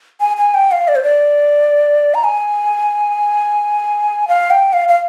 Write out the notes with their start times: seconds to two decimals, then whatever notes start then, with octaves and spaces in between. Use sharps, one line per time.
0.21 G#5
0.37 G#5
0.54 G5
0.72 F5
0.88 D5
0.95 C5
1.03 D5
2.14 A#5
2.24 G#5
4.28 F5
4.51 G5
4.73 F5
4.89 F5